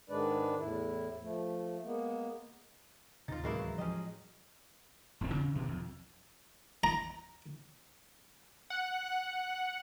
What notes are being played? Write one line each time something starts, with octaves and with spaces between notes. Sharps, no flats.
G#2 D#3 G#3 D4 B4 D5
E2 A2 E4
F3 A3
G#3 A#3 B3
D1 D#2 C3 D#4 F4 A6
A2 C#3 E3 F#3 G#3 A#3 E4
F3 C#4 G4 D#5
E1 E2 A2 C4
C#3
G2 B2 D#3 E3
B1 F2
A#5
F#5